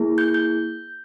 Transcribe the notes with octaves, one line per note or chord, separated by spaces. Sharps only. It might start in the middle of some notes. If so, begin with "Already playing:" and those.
Already playing: A#3 E4 G#4
G6
G6